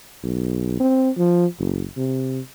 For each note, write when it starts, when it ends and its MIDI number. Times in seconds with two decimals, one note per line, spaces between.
0.24 0.75 35
0.80 1.10 60
1.17 1.46 53
1.59 1.86 30
1.97 2.40 48